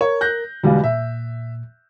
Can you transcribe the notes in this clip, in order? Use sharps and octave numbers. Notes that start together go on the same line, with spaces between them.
A#4 C#5
F#6 G6 A#6
E2 B2 D3 G3 G#3 F5
A#2 E5